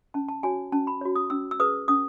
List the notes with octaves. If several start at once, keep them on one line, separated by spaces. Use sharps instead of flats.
C#4 A5
A5
F#4 C#5 G#5
C#4 A5
B5
F#4 C#5
D#6
C#4 E6
E6
G#4 B4 D#6
C#4 D#6